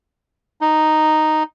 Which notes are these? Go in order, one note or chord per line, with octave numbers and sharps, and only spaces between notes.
D#4